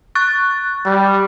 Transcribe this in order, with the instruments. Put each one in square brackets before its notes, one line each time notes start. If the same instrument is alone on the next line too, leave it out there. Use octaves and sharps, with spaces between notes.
[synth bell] C#6 F#6 A6
[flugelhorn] G3